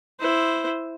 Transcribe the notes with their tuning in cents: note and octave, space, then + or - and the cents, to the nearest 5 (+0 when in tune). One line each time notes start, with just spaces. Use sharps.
E4 +0 C5 +0